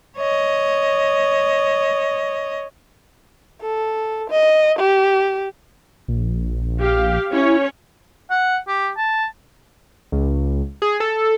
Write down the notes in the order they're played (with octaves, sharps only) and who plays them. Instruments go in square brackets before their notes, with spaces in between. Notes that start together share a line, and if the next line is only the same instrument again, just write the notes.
[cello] C#5 D#5
[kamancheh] A4
D#5
G4
[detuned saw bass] A#1
[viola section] G4 F5
[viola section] C#4 C#5 [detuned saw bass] E4
[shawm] F#5
G4
A5
[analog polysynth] C#2
G#4
A4